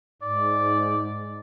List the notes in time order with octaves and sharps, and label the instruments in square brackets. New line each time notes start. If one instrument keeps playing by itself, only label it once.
[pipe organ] G#2 [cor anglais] D5